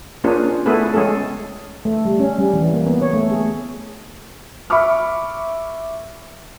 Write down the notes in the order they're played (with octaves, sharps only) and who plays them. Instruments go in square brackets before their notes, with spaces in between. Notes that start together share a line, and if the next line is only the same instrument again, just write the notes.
[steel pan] A#3 C#4 D4 F4 G#4 C5
A3 B3 E4 G#4 A4 B4
G#3 C#4 G#4 A4
A3
G3
C#4
G3
E3
A#3
B3
C#5
A3
G#4
[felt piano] E5 B5 C#6 D6 F6